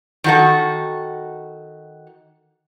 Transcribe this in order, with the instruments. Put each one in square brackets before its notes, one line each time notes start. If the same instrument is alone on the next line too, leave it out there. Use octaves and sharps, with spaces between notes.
[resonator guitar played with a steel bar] D#3 F#4 A4